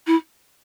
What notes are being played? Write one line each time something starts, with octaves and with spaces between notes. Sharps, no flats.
E4